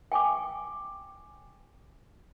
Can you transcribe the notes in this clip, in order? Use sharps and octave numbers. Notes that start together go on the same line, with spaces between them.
G5 G#5 C#6 D6